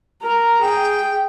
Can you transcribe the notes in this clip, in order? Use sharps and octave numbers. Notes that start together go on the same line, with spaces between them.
A#4 A#5
G#4 G5